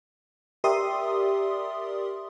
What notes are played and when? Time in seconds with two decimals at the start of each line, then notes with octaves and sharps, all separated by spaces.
0.64 G4 A#4 D5 E5 C6 D#6